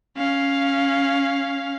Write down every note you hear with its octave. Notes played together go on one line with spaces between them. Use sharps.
C#4 F5